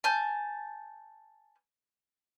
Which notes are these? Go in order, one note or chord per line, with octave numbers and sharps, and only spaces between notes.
G#5 A5 G6